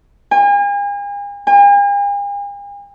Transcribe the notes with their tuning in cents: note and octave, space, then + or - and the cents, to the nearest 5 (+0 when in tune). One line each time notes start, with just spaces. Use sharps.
G#5 -40
G#5 -45